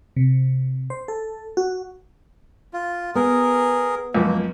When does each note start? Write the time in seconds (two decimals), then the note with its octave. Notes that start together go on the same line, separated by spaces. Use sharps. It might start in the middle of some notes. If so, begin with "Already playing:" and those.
0.16 C3
0.90 C5
1.08 A4
1.57 F#4
2.74 F4
3.15 B3 G#4 A#4
4.15 C#2 F#2 F3 A#3